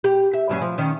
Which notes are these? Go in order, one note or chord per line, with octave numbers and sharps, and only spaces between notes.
G4
E5
G2 F#3 C#4
F3
D#3 C#4